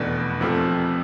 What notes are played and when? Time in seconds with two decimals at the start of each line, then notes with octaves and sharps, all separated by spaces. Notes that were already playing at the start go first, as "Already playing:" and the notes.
Already playing: F1 E2 B2 A3 D4
0.41 F2 C3 F3 A3